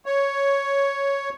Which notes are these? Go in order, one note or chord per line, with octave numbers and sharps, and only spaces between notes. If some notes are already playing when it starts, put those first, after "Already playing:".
C#5